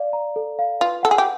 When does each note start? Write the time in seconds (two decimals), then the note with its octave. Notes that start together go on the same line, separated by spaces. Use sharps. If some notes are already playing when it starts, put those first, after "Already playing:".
Already playing: D5 F5
0.13 A#5
0.36 A4
0.59 F5
0.81 F4 B4
1.03 A4 F#5
1.11 G#4
1.18 G4